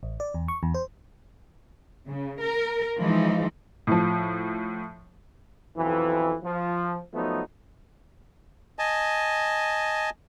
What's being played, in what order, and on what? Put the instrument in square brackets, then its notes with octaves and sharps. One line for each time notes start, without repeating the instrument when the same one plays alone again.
[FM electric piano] A1
D5
E2
C#6
E2
C5
[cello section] C#3
A#4
E3 F3 G#3 D#4
[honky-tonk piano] A2 F3
[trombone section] B1 F2 E3
F3
F3 F#3 A3 B3 D#4
[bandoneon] D#5 G#5 A5